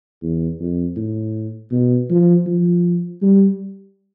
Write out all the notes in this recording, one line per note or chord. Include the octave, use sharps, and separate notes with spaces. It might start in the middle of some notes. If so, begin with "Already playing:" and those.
E2
F2
A2
B2
F3
F3
G3